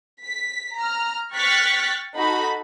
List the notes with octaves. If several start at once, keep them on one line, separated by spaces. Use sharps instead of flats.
B6
A#5 F6
G5 C#6 F6 F#6 A6 B6
D#4 F#4 A4 B5